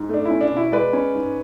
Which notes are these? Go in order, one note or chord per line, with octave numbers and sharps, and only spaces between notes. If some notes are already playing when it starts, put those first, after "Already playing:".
Already playing: G#2
A3 D4
E4
C#4
D4
B2 E4
G#3 B4 D5
C#4
G#2